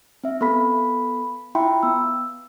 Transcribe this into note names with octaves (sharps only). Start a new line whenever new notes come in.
C4 E5
B3 A4 B5 B6
E4 F4 E5 G5 B5 C6
B3 E6